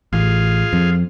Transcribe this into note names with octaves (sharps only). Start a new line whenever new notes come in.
A1 F4 G#4 F5
F2